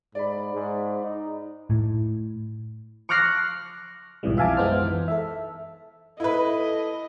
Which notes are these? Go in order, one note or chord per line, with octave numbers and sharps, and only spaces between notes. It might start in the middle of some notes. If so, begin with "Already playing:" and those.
G#2 D5 B5
G#2
D#4
A2
C#6 D6 F6 F#6 A#6 C7
B1 F2 G#2 C3 E3 G3
F4 E5 F5 G#5 A5 D6
F#2 G#3 B3 D#4 C5 F6
E3
A4 E5
E4 A4 B4 D#5